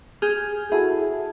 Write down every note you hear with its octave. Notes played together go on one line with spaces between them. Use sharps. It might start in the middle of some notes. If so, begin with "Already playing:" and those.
G#4 F6 G6
E4 F#4 G#4 A4